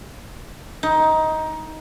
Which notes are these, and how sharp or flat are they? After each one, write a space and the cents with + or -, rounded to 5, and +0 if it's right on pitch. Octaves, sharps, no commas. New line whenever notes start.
D#4 +15